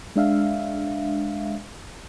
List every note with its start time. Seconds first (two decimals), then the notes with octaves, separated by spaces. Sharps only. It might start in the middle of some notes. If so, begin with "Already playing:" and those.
0.16 G#3 D4 E5 F5